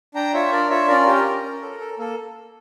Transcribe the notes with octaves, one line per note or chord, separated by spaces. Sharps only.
D4 G5 A#5
F4 C#5 E5
D4 A#4 D5
F4 C#5 E5
C#4 A#4 D5
G4 A#4
C#4
C#4
A4
A4
A#3 A4